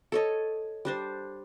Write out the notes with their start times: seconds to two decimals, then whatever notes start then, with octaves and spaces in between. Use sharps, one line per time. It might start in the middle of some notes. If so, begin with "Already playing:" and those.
0.12 A4 C#5 D#5
0.85 G3 D4 C5